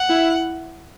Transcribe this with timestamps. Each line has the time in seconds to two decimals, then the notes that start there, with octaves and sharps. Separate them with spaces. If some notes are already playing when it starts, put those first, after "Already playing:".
Already playing: F#5
0.09 E4